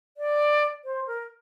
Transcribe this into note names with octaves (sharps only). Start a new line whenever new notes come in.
D5
C5
A#4